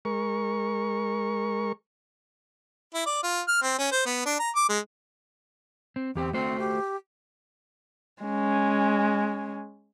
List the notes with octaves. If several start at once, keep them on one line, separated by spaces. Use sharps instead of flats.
G#3 A#4 C#6
E4
D5
F4
F6
C4
C#4
C5
B3
D4
A#5
D6
G#3
C4
E2 C4 G4 G5
A3 C4 F#4 C5
G4
G#3 C#4